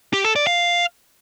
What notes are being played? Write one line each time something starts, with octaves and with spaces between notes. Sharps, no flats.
G4
A4
D5
F5